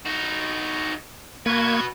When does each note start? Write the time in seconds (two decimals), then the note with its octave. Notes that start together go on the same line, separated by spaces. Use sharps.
0.06 D#4 F#4
1.46 A#3 F#4 B4 C#6 G#6